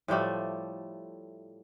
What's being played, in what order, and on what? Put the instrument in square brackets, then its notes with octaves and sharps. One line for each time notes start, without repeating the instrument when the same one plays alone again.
[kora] A2 F3 G3 A3